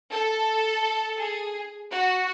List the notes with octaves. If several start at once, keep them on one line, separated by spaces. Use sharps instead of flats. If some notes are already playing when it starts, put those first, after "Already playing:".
A4
G#4
F#4